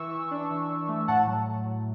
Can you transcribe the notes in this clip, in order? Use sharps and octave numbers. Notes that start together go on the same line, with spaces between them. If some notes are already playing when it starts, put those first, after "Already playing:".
Already playing: E3 C#6 E6
E3
D4
E3
D4
A3
A2 F#5 A5
F#3
F#3
F#3